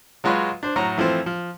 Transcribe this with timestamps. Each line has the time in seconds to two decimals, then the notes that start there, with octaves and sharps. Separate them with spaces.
0.24 F#3 G#3 F4 B4 C#5
0.63 D4 C5
0.76 A2 F#3 A#5
0.98 E3 F3 A3 C4
1.26 F3